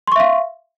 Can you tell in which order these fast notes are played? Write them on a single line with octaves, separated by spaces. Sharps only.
C6 C#6 E5 F5